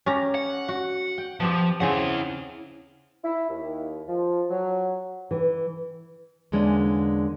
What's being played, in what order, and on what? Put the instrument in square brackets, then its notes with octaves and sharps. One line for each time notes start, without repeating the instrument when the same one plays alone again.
[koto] C#4 G4 A#5
[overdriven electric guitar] F#5
[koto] F#4
G5
[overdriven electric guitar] F3 [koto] B3 C4 G4
[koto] C#3 C4 G#4 [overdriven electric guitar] E4 F#5
[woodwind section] E4
D#2
F3
F#3
[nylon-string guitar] E3
E2 D3 G#3 A#3 C#4 D4